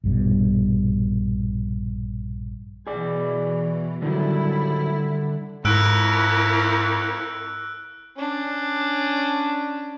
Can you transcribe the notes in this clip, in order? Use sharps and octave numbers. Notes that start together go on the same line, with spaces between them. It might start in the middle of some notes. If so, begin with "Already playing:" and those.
A#1 G2 B2
B2 E3 G#4 D5
A2 D3 D#3 F#3 G3 E4
F2 G#2 E4 A#4 E6 F#6 D7
C#4 D4